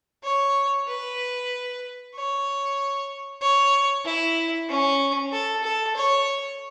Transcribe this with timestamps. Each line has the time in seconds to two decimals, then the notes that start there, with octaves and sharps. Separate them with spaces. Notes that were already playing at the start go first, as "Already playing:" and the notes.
0.24 C#5
0.88 B4
2.15 C#5
3.42 C#5
4.05 E4
4.69 C#4
5.33 A4
5.64 A4
5.96 C#5